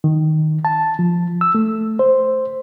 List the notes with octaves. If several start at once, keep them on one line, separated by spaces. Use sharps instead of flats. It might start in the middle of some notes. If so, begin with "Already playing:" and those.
D#3
A5
F3
E6
A3
C5